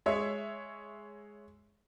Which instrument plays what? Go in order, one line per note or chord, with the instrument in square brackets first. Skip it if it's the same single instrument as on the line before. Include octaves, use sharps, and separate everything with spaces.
[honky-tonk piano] G#3 C#5 E5